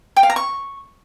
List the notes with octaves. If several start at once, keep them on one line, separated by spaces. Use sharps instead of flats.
G5
F5
A#5
C#6